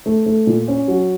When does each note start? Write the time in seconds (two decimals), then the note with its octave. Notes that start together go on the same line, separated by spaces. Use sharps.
0.06 A3
0.26 A3
0.47 A#2
0.68 C#4
0.88 F#3